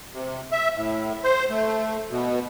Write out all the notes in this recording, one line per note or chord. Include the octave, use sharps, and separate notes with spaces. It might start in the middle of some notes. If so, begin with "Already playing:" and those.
C3
E5
A2
C5
A3
B2